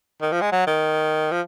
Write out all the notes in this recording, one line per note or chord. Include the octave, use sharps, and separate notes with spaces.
D#3
F3
G#3
F#3
D#3
F3